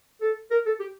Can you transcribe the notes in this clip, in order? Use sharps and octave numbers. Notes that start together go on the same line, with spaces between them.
A4
A#4
A4
G4